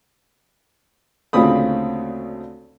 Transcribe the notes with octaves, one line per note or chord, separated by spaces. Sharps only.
D2 A#2 C#3 C4 B5 D#6